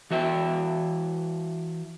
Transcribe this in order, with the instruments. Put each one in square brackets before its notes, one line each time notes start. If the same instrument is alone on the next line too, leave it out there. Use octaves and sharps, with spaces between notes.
[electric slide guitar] E3 F#4 E5 G5